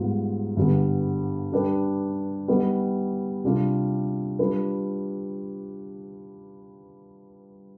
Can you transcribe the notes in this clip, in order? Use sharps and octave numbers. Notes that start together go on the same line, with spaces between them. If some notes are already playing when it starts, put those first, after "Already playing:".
Already playing: G#2 G3 B3 F4
G2 D3 G3 B3
G3 D4 G4 B4
G3 B3 D#4 B4
C3 G3 D4 F4
G3 D4 F4 B4